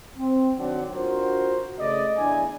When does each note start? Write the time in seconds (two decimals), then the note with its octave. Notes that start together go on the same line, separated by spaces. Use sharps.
0.17 C4
0.57 D#3 F#3 C4 D4 F#5
0.93 D4 F4 F#4 A#4 C5
1.78 C#3 A3 D5 D#5
2.18 E2 D4 E4 G#5